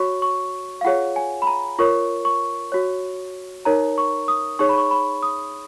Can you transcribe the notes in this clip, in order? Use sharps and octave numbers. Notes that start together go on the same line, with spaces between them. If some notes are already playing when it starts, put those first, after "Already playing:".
Already playing: F#4 C#5 C#6
C#6
F5
F4 G#4 C#5 F#5
G#5
B5
A#5
F4 A#4 C#5 C#6
C#6
F#4 C#5
D#4 A#4 C#5 A#5
C#6
D#6
D#4 G#4 C#5 C#6
B5
C#6
B5
D#6